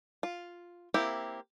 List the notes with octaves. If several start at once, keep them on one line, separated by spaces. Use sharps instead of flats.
F4
A#3 C4 E4 G4